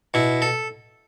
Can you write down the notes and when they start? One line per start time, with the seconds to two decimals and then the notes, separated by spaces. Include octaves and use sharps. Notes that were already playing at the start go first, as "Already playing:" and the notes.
0.14 B2 E4
0.42 A4